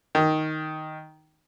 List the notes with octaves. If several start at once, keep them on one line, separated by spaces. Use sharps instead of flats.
D#3